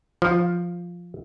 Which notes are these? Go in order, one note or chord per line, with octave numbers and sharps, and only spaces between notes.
F3